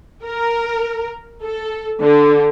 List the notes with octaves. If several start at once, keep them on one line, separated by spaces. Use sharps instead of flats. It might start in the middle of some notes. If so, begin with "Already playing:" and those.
A#4
A4
D3